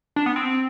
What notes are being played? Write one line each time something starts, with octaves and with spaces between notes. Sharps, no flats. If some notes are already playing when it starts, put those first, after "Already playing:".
D4
B3
C4